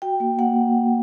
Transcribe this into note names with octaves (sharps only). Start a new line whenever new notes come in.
F#4 G5
A#3
A#3 F#5